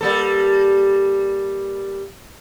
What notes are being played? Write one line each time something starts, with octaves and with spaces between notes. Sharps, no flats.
G3 A#3 A4